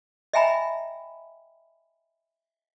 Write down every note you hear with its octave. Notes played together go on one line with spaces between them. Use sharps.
D#5 E5 G5 G#5 A#5 B5